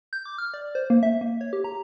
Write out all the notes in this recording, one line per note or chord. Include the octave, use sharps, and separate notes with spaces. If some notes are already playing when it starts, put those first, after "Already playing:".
G6
D6
F6
D5
C5
A#3
E5
A#3
C#5
G4
A#5